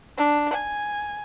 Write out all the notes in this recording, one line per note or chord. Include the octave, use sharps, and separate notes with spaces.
D4
G#5